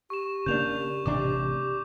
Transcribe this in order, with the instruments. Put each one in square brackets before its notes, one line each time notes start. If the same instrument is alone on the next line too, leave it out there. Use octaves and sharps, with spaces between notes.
[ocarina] G4 [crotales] C#6 E7
[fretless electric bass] C#3 A#3 D4 [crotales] G6 F7
[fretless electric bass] A1 C3 D4 [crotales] D6